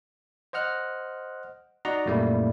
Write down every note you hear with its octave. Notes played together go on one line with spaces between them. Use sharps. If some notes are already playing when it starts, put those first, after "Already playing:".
C5 D#5 F#5 F6 F#6
D#4 F#4 D5 D#5 F#5 A#5
F#2 A#2 G3 A3 A#3 E4